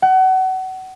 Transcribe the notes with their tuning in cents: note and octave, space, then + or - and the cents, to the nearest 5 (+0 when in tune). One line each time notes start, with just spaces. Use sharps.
F#5 +30